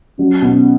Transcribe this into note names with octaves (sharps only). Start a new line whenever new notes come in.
F#3 C#4
B2